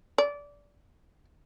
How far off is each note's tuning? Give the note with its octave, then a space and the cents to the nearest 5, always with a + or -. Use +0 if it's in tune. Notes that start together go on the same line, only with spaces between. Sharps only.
D5 -20